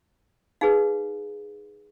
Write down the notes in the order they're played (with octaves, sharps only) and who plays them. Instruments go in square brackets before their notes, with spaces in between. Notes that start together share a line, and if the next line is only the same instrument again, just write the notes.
[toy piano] D#4 G#4 B4 F5